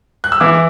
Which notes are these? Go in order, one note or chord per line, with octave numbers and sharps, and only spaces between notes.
F#6
E6
E3 D6